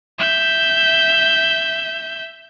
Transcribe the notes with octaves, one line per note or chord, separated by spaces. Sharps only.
E5 G6